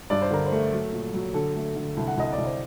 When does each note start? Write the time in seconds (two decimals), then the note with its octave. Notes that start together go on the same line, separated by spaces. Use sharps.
0.10 G2 D5
0.22 C5
0.31 D3 A#4
0.46 C5
0.52 A3
0.73 F#3
0.93 A#2
1.14 F#3
1.34 D3 A4
1.55 A3
1.76 D3
1.97 C2
2.07 F#5
2.17 C2 D#5
2.33 D5
2.38 C2
2.46 C5